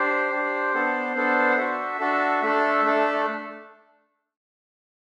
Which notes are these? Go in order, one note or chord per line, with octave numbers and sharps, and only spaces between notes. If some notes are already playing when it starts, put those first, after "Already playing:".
Already playing: D4 G4 C5
D4 G4
B3 D4 A4
B3 D4 A4
F#5
D4 F#4 A4 E5
D4 F#4 A4
A3 D4 A4 E5
A3 D4 A4